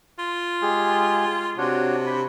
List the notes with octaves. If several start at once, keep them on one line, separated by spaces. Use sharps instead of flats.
F4
G#3 G4 G#4
C3 D4 F#4 C#5
B5